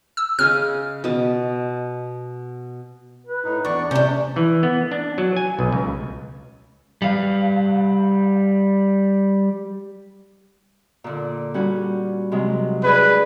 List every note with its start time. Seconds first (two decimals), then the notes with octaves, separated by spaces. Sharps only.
0.17 E6
0.39 C#3 G#4 D#5 F6
1.04 B2 D#5 A5
3.26 B4
3.44 A2 D#4
3.65 E2 D4 D5 C#6
3.91 C3 C#4 D4 G6
4.36 E3
4.63 B3
4.92 D4
5.18 F#3
5.37 G#5
5.59 B1
5.72 C#2
7.02 G3 F5
11.04 A#2 D3
11.54 G3 C#4 F#4
12.32 C3 F#3 G#3
12.84 D4 G#4 B4 D5